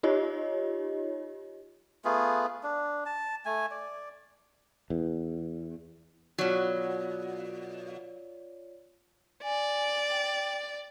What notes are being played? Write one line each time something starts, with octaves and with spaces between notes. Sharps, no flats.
D#4 F4 G4 C#5 D#5
A3 B3 F4 G#4
D4
A5
A3 G#5
D5
E2
B2 F#3 F4 C#5 D5
D5 G#5
G5